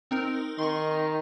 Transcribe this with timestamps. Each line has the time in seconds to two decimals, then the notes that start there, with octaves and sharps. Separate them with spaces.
0.11 C4 D#4 A#4
0.58 D#3 C6 C#6